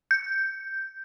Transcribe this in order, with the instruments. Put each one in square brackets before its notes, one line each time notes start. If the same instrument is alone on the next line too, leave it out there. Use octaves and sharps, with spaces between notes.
[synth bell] G6